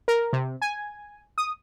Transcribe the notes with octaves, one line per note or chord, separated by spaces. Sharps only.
A#4
C3
G#5
D#6